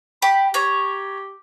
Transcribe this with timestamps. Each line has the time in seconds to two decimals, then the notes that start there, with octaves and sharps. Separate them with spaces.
0.22 G4 B5
0.54 G4 C#5 A#5